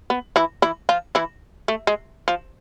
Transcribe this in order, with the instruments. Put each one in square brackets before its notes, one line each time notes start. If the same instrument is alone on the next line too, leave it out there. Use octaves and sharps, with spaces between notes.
[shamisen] B3
E3 E4
E3 E4
F3 F4
E3 E4
A3
G#3
F3